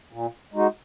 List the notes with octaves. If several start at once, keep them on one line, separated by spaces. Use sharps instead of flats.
A#2
G#3 D#4 F#4